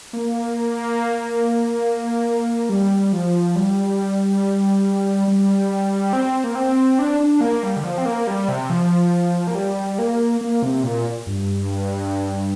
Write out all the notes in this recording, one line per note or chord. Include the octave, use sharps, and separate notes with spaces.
A#3
G3
F3
G3
G3
C4
A#3
C4
D4
D4
A#3
G3
D3
F3
C4
A#3
G3
C3
F3
A#3
G3
A#3
A#3
C3
A#2
G2